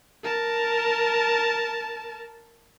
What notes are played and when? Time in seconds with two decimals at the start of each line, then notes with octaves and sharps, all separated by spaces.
0.24 A#4 A5